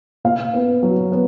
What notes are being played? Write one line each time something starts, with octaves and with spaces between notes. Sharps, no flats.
A#2 F5
B3
F#3
B3